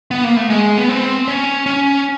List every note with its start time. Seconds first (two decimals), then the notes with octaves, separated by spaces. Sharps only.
0.11 B3
0.24 A#3
0.37 A3
0.50 G#3
0.78 B3
0.89 C4
1.28 C#4
1.66 C#4